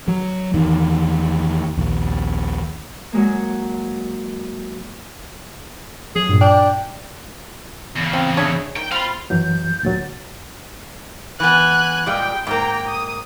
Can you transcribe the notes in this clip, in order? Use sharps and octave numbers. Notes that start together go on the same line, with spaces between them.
F#3
E2 D#3
A#1 D#2
F#3 G#3 A#3
F#3 G#4
G2 A#2
D4 G5
E2 C#3
F3 C4
D4 G#4 C#5 E5
D#3 G5
C4 F4 F5 B5 F6
F#2 E3 F#3 G6
D2 A#2 F#3 A6
E3 B3 G#5 F#6
A#2 G3 G#3 G5
G#2 A#3 G5 A#5
D#6